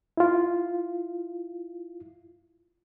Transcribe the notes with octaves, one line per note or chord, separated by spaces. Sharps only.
E4 F4